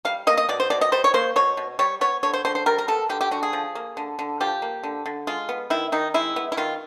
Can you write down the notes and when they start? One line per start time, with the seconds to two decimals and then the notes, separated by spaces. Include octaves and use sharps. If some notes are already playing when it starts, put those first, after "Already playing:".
0.05 G3 F5
0.27 A#3 D#5
0.37 D#5
0.49 B2 D5
0.60 C5
0.70 B2 D5
0.81 D#5
0.92 G3 C5
1.04 C#5
1.14 A#3 C5
1.36 B2 C#5
1.57 B2
1.79 G3 C#5
2.01 B3 C#5
2.23 D3 C#5
2.34 C5
2.45 D3 C5
2.55 C5
2.66 G3 A#4
2.78 A#4
2.88 B3 A4
3.09 D3 G4
3.21 G4
3.31 D3 F#4
3.43 G#4
3.53 F3
3.75 A#3
3.97 D3
4.19 D3
4.40 F3 G4
4.62 A#3
4.83 D3
5.06 D3
5.27 G#3 F4
5.49 B3
5.70 D#3 E4
5.92 D#3 D#4
6.14 G#3 E4
6.36 B3
6.52 E4
6.57 D#3 F4